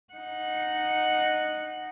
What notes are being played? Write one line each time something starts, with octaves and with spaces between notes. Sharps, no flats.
D#4 F#5